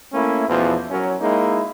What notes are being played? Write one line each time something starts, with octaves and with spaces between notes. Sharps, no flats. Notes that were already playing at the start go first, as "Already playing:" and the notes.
A3 A#3 C#4 E4
E2 B2 E3 F3
F#3 C#4 A#4
G#3 A#3 D#4 E4